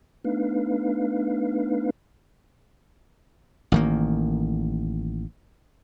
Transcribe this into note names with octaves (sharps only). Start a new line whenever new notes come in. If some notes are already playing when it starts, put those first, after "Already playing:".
A3 B3 D4 D#4 B4 F5
A1 D#3 A#3